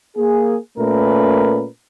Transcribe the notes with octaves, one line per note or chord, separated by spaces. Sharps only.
A#3 G#4
A#2 A3 C#4 A#4 B4